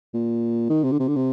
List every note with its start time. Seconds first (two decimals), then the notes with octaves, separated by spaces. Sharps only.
0.13 A#2
0.69 D#3
0.84 C3
0.91 D3
0.99 C3
1.08 D3
1.16 C3